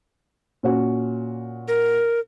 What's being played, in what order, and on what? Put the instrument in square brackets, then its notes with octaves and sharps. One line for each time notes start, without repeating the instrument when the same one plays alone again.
[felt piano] A#2 C#4 F#4
[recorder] A#4